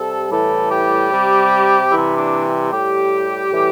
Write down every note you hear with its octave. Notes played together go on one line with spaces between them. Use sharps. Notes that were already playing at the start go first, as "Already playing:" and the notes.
Already playing: C3 G3 A4
A2 E3 G3 A4
G4
C3 G3
C3 E3 G3 E4
D4
A2 G3 G4
A2 E3 G3